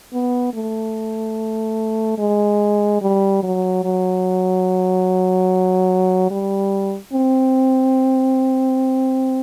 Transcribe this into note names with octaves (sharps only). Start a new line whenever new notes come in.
B3
A3
G#3
G3
F#3
F#3
G3
C4